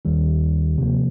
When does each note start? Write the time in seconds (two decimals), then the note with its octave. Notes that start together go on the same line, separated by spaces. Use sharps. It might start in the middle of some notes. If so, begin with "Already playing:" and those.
0.05 D#2 D#3 G3
0.77 D2 C3 F3 A#3